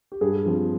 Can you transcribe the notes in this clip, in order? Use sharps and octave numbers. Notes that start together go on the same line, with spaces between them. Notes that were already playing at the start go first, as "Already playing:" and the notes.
G4
G2 G#4
F3 C4